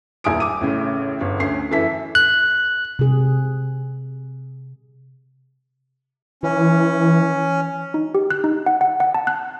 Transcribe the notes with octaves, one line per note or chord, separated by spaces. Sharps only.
D#1 E4 G#5 D#6 D7
D6 D#7
A1 A2 C#3
G1
D2 C#4 C7
F#2 E3 E4 A4 B6
F#6
C3 G#4
E3 C#4
D#4
G4
F#6
D#4
F#5
F#5
F#5
A5
F#6